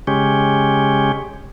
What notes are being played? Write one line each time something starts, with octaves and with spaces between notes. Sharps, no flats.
C#3 G#3 C#4 G4